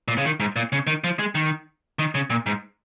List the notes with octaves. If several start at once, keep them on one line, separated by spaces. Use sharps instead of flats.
A#2
C#3
D#3
G#2
A#2
C#3
D#3
F3
G#3
D#3
D#3
C#3
A#2
G#2